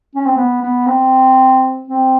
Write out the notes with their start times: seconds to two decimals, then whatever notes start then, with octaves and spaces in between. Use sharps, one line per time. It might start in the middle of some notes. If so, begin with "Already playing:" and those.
0.16 C#4
0.26 C4
0.37 B3
0.62 B3
0.87 C4
1.88 C4